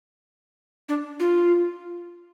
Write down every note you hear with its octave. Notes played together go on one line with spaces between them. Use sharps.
D4
F4